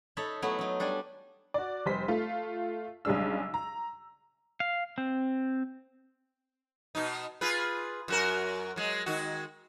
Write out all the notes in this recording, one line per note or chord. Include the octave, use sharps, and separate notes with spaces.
D#4 A4 C#5 E5 B5
F#3 A3 B3 E4
F#3 D#4
G3 D4 F#5 G#5
F#4 D5
F1 G3 C5 B6
A3 F4
B1 C#3 G3 G#3 D4 E6
A#5
F5
C4
B2 D#4
F4 G#4 B4
F#2 F#4 A#4
F#3 G#3
D#3 G#3 F#4